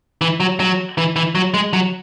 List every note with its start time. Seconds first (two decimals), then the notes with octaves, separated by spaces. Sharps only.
0.21 E3
0.40 F#3
0.60 F#3
0.98 E3
1.16 E3
1.35 F#3
1.54 G#3
1.73 F#3